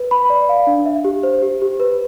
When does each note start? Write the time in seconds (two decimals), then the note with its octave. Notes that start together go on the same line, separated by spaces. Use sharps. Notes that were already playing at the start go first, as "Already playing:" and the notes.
Already playing: B4
0.11 B5
0.30 D5
0.49 F5
0.67 D4
0.86 E5
1.04 G4
1.23 C5
1.42 G4
1.62 G4
1.80 B4